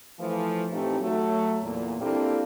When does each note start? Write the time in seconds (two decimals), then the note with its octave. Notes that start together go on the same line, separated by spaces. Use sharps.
0.19 E3 F3 A3
0.72 A2 E3 A3 C4 D#4 G4
1.00 F#3 A3
1.63 E2 A#2
2.00 A#3 C4 D4 E4 G4 A4